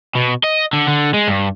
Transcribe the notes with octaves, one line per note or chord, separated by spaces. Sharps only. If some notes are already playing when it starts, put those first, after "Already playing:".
B2
D#5
D3
D3
G#3
G2